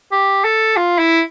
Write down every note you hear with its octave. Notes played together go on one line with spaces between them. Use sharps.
G4
A4
F4
E4